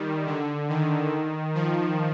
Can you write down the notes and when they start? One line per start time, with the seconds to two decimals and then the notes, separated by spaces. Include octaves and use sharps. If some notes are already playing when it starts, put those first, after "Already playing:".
Already playing: D#3 G3
0.27 D3
0.69 D#3
1.55 F3